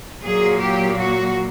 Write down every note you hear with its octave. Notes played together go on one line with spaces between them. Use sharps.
A#2 F#3 A#3 G#4
G4
F#4